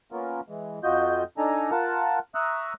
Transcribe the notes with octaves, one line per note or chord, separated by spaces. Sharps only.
A#3 B3 C#4 F4 A#4
E3 G#3
F2 F4 F#4 D#5 G6
D4 D#4 A4 G#5 A#5
F4 A#4 F#5 A5
E5 A#5 C#6 D#6 E6 F#6